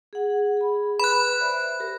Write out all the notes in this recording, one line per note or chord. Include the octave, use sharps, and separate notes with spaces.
G#4 F#5
G#4 B5
B4 B5 F#6
C5 D5 E5
G4 A#4